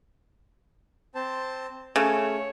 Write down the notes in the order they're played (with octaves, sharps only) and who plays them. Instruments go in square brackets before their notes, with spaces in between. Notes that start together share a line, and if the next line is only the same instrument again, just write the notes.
[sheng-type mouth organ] C4 C5 A5
[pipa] C#3 [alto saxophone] A3 [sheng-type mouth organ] C#5